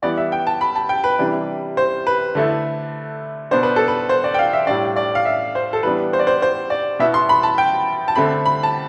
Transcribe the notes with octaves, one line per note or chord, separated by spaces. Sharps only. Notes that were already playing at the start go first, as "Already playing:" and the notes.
E3 G3 B3 D5
E5
G5
A5
B5
A5
G5
B4
C3 E3 G3 D4
C5
B4
D3 A3 E4
B2 B3 D4 C5
B4
A4
B4
C5
D5
G5
F5
E5
A2 G3 D4 D5
D5
F5
E5
C5
A4
E3 G3 B3 D4 B4
C5
D5
C5
C5
D5
B2 B3 E4 E5
C6
B5
A5
G5
A5
D3 A3 C4 B5
B5
A5